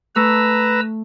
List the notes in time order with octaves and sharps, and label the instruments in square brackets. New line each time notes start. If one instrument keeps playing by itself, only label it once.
[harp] A3 [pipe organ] B4 A#5 E6